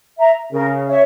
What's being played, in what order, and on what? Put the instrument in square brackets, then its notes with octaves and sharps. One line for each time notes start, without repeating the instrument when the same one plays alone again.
[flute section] E5 A#5
[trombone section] C#3 [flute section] A#4
[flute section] C#5 E5